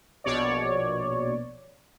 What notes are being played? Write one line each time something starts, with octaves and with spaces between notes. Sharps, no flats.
A#1 B2 C#5 D5